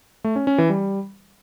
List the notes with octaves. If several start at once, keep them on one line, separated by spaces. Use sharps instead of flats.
A3
C#4
C#4
E3
G3